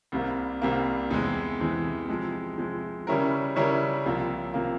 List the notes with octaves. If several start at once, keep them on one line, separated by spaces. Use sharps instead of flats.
C2 C3 G3 A#3
C2 C3 G3 A#3
E2 C3 E3 G#3
E2 C3 E3 G#3
C3 F3 G#3
C3 F3 G#3
C#3 G3 C#4 E4 A#4
C#3 G3 C#4 E4 A#4
C2 C3 F3 A#3
C3 F3 A#3